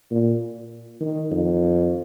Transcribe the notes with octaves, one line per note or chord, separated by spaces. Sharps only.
A#2
D#3
F2